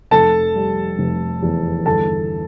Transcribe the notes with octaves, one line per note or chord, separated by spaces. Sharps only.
F1 A4 A5
G3
F1
E2
G1 A4 A5